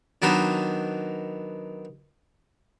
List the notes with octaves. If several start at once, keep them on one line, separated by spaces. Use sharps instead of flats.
D#3 F#3 B3 D4 D#4 C5